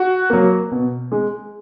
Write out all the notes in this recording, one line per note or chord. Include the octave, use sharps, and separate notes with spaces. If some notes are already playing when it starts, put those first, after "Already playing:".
Already playing: F#4
F#3 A#3
B2
G#3